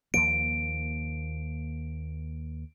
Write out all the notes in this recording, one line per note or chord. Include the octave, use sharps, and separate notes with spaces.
D#2 F3 A#3 D7